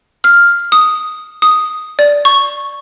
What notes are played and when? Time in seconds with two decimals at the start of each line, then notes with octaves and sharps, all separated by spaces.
0.24 F6
0.72 D#6
1.42 D#6
1.99 D5
2.25 C#6